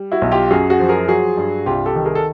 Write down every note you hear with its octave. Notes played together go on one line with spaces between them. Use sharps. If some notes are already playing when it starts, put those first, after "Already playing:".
Already playing: G3
E4 F#4
B1
F4 G4
F#2 F#4 G#4
F#4 G#4
F3
G#4 A#4
F#3 F#4 G#4
G2
C2 F4 G4
G4 A4
D#3
G#4 A#4
A4